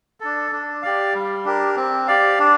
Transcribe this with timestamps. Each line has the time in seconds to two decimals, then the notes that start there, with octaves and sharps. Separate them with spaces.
0.20 D4 A4
0.52 D4
0.82 G4 D5 F5
1.14 G3
1.45 D4 G4 A#4
1.76 C4
2.08 G4 D5 F5
2.39 D4